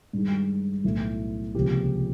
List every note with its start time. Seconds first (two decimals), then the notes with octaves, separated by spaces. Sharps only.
0.13 G2 D#3 G#3
0.84 B1 A2 E3 A3
1.54 C#2 C3 F3 A#3 G4